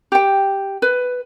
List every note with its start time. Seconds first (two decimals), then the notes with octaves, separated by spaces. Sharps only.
0.12 G4 G5
0.82 B4